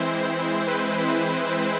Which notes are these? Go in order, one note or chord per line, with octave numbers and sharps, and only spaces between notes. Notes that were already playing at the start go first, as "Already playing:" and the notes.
Already playing: E3 G#3 C4 E4 C5
B4